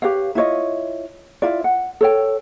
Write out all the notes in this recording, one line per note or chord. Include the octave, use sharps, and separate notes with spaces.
G4 B4 C#5 F5
E4 F4 C#5 D#5
E4 F4 D5
F#5
A4 C#5 G5